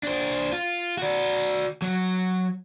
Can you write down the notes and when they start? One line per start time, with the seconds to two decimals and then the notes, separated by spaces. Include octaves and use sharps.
0.03 D4 C5
0.53 F4
0.98 F#4 D5
1.82 F#3